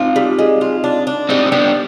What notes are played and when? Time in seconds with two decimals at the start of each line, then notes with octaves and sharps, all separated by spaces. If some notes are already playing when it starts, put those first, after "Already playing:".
Already playing: C4 D#4 F4
0.16 G3
0.39 G#3
0.61 F4
0.84 D4
1.07 D4
1.29 G3 C4 D#4
1.46 C4
1.52 G3 B3 D4